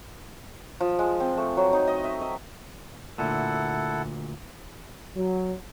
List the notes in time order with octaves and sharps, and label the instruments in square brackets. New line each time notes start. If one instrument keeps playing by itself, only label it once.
[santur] F3
G#3
C4
A3
F#3
D#4
D#5
E5
D#5
[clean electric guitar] D2 A#2 [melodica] E4 A4 F#5
[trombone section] F#3